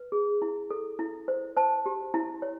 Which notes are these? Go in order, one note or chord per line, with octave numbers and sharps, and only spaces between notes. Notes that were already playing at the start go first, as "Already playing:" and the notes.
Already playing: B4
G#4
E4
A4
E4
C5
C5 A5
G4
E4
C#5